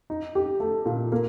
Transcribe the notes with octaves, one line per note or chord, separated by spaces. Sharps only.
D#4
G4
A3
A#2
A#3